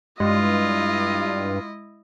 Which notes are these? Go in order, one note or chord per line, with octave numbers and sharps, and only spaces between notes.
G2 G#3 E4 F4 D#5